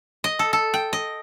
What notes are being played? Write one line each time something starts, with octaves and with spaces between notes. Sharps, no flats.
D#5
A4
A4
G5
D#5